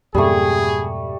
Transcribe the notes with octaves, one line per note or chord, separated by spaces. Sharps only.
F2 G#2 B2 G3 A3 G#4